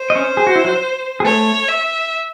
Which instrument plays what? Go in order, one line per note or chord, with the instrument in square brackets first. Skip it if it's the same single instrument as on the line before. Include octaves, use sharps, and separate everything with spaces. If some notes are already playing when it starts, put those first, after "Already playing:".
Already playing: [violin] C5
[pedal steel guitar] D#5
C#4 C#5
G#4
F#4
E4
F#3 F#4
G#4
[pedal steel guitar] A3 A4 [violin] C#5
[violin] E5